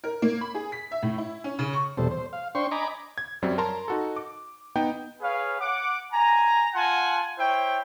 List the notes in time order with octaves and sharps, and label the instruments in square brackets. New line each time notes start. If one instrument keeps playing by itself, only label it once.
[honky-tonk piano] A#4
A#3
B5
G#4
B6
E5
A2
E4
C#4
C#3
C#6
[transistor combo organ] E2 B2 G3 A4 C5
C5
F5
D4 C5 G5 C6 C#6
D#5 G#5 A#5 B5 D6
[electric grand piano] G#6
F#2 F#3 G3 C4
A#4 A5 A#5 C6
D#4 F#4 A4
D6
B3 D#4 G5 G6
[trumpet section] G#4 B4 C#5 F5
F#5 D6
G#5 A#5
F4 F#5 G#5 A5 C6
E4 C5 C#5 G5